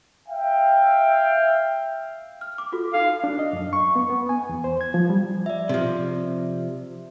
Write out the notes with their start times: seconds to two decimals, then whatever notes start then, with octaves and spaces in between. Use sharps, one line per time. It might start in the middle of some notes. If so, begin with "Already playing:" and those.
0.28 E5 F5 G5
2.41 F6
2.58 D6
2.72 F4 F#4 A4
2.94 D#4 A4 F5
3.24 D4
3.39 D#5
3.53 F#2
3.73 C#6
3.96 B3
4.10 B3
4.29 G#5
4.49 E2
4.64 C5
4.81 G#6
4.94 F3
5.10 G3
5.46 D5 E5
5.69 C3 F3